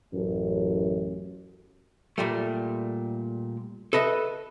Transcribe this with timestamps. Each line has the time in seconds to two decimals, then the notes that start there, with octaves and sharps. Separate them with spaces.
0.13 A1 F#2
2.18 A#2 G3 A3
3.93 A4 B4 D#5 E5